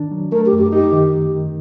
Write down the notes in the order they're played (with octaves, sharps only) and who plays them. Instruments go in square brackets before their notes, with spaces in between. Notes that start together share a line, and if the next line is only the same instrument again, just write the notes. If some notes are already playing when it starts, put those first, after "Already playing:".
Already playing: [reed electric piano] D#3 D4
F#3
[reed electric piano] A3 [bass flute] A#4
[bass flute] G4
[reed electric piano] F#2
[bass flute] G4
[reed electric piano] D#4 [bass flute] G4
[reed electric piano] D#3